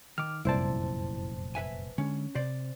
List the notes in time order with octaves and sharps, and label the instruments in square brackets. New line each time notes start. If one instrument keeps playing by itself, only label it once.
[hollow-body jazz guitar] D#3 [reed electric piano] D6 F6
[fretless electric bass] F1 F#2 A#2 [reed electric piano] C2 C5 A5 [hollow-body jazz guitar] E4 D5
[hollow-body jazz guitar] B4 E5 G#5
[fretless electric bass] D3 G#3 [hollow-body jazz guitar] C#4
[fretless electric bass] C3 [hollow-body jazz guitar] C5 D5